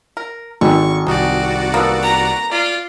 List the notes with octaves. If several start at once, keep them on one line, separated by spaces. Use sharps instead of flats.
A#4
G#1 D3 C#6
C2 D#4 F#4 D5
A#3 B3 A4
A#5
F4 D5